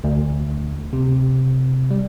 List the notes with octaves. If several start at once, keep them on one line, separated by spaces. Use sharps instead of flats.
D2
C3
G3